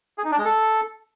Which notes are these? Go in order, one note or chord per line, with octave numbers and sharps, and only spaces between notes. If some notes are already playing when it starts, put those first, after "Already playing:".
G#4
D#4
D4
G#3
A4